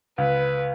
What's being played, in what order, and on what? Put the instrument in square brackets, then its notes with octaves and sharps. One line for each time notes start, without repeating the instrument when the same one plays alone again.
[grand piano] C#2 [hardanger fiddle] B4